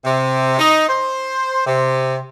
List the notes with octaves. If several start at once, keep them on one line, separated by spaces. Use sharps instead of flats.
C3
D#4
C5
C3